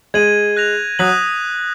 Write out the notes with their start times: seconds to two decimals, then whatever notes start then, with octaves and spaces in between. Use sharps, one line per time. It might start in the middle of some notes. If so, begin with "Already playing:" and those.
0.14 G#3 G#6 D#7 F#7
0.57 F#6 A#6 F7
0.99 F#3 D#6 F#6 B6 F#7